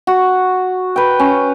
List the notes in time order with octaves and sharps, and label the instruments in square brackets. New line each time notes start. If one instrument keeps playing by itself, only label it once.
[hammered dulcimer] F#4
B4 G5
C#4